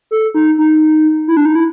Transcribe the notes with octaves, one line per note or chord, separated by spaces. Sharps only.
A4
D#4
D#4
E4
D4
D#4
E4